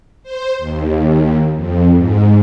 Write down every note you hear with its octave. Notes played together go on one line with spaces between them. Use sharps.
C5
D#2
F2
G#2